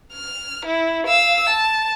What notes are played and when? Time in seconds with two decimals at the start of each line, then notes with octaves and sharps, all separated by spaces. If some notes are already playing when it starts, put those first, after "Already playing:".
0.13 F6
0.65 E4
1.07 F5 E6
1.49 A5